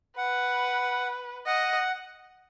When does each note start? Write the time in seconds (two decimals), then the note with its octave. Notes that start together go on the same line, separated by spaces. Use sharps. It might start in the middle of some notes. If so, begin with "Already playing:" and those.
0.17 B4 F#5
1.46 D#5 F#5